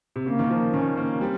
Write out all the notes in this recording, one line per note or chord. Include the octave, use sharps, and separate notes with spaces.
C3
C#3 A#3
D#3
F3
D#3 C#4
A#3 C#4
G3 C4